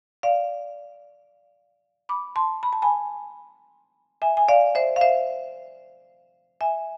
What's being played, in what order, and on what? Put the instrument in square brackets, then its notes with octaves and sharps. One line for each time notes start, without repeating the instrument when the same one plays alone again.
[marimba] D5 F5
B5 D6
A5 C6
B5
A5
G#5 B5
E5 G#5
G#5
D5 F5
C5 E5
F5
C5 E5
E5 G#5